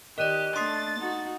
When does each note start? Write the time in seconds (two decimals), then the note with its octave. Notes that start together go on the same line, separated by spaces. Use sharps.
0.18 D#3 G4 A#4 D5 D#5 F#6 D#7
0.56 A3 D4 C6 D#6 A6 C7
0.98 D#4 F#4